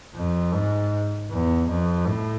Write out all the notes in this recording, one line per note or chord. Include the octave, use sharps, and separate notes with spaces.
F2
G#2
E2
F2
A2